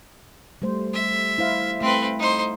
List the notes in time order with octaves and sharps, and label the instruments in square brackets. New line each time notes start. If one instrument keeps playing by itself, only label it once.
[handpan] G3 A3 C5
[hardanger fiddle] E5
[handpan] E4 C5 F5
[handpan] A3 [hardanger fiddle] C4 B4
[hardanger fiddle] D#4 C5